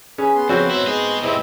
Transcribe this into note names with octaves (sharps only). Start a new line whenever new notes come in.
C#4 G#4 B4
B3 C6
F2 C#3 C4 F#4
G#2 F#3 E4
G#2 G#4 D#5
E2 G#2 C3 C4 E4 D#5